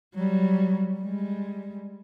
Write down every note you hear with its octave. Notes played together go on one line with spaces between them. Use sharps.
F#3 G3
G3 G#3